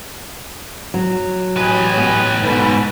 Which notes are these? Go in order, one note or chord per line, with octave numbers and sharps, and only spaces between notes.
F#3
A2 G4 B4 D#5 G#5
B3
G#2 B2 A4 B4